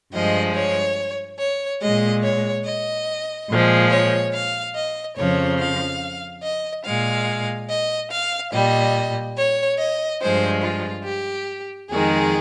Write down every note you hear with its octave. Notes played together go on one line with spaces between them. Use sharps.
G2 F3 G#3 D#5
C#5
C#5
A#2 G#3 D#5
C#5
D#5
A#2 F3 G#3
C#5
F5
D#5
F2 C#3 F3 C#5
F5
D#5
A#2 G#3 F5
D#5
F5
A#2 G3 D#5
C#5
D#5
G2 F3 G#3 C5
F4
G4
F2 D#3 G#3 G#4